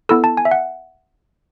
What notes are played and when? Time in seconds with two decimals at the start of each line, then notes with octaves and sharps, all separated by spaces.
0.09 B3 E4 A4 E6
0.24 A5
0.37 G#5
0.45 E5
0.51 F#5